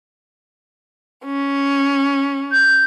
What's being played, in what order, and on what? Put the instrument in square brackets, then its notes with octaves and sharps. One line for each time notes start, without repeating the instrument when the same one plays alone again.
[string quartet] C#4
[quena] G6